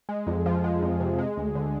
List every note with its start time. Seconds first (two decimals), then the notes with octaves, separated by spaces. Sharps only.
0.09 G#3
0.27 F2
0.46 F3
0.64 G#3
0.82 F2
1.00 C3
1.19 G#3
1.37 D2
1.55 D3